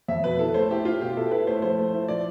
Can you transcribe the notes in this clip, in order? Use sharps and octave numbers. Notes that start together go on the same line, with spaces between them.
F2 E5
B2 B4
E4 A4
A3 C5
E4 G4
E4 F4
B2 G4
E4 A4
E4 B4
A3 C5
F3 C5
A3
E4
F3 D5